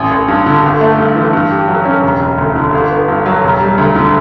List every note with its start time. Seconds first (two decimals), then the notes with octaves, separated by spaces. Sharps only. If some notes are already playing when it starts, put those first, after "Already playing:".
Already playing: A1
0.11 A1
0.28 G2
0.46 D3
0.63 G1
0.81 A3
0.98 G2
1.15 E3
1.33 G2
1.51 G4
1.68 F#3
1.85 C#4
2.03 E1
2.20 E1
2.38 D2
2.56 D3
2.73 G1
2.91 B3
3.08 G2
3.26 F#3
3.43 E1
3.60 G3
3.78 D2
3.96 D3